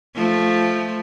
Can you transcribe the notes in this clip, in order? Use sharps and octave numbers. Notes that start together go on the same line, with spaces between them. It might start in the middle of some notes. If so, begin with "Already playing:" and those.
F3 A3